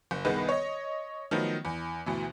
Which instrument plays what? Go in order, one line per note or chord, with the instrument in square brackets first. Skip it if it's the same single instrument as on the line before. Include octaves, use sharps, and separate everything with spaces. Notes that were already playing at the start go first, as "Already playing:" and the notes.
[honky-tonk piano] F#1
C2 D#3 B3 G#4 B4 D#5
C#5 D#5
D#3 F3 F#3 A3 B3 D#4
E2
D2 B2 E3